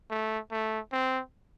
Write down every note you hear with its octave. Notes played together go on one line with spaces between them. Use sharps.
A3
A3
C4